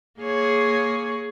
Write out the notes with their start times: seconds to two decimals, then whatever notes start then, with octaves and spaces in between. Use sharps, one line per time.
0.20 A#3 G#4 C#5